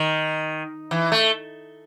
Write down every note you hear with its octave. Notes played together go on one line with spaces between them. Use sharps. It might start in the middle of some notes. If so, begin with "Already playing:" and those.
Already playing: D#3
E3
A3